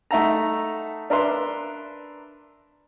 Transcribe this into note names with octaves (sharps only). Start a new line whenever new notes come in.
A3 D#4 E5 F#5 A5 A#5
D4 A#4 B4 E5 C6